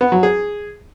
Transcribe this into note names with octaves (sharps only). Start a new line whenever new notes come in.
B3
F#3
G#4